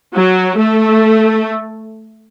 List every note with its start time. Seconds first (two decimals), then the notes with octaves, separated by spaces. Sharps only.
0.14 F#3
0.58 A3